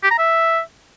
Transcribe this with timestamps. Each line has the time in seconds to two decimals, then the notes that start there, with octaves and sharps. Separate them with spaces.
0.03 G4
0.11 A#5
0.19 E5